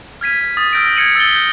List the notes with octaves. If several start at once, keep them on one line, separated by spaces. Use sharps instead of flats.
F6 G#6 B6 D#7
D#6 A6 B6 D#7
E6 F6 G6 A#6 D7
G#6 C#7 D#7 F#7
E6 A6 B6 G7
G6